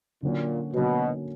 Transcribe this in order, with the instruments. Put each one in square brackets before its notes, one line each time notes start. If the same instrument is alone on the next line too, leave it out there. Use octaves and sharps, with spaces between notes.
[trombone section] A#2 [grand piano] D3 F#3 A#3 C#4 F#4
[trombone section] B2 [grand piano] D3 F#3 A#3 C#4 F#4